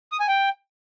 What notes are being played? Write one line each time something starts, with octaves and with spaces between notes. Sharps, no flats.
D#6
G#5
G5